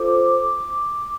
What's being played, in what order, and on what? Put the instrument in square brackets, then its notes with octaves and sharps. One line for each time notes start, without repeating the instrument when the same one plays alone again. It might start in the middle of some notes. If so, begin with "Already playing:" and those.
Already playing: [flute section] F4 A4 C5 D6